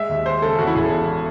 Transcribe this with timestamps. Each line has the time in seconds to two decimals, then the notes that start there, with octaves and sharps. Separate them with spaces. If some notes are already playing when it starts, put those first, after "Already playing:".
Already playing: G#3 E5
0.09 D#2
0.26 G#3 C5
0.42 C#3 A4
0.58 E2 F#4
0.67 E4
0.75 E1 G#4
0.83 A4
0.91 E2